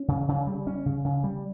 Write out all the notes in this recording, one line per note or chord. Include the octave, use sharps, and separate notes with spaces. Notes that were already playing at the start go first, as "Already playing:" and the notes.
Already playing: C#4
C#3
C#3
G3
C#4
C#3
C#3
G3